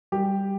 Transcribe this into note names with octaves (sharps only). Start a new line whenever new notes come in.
G3 G4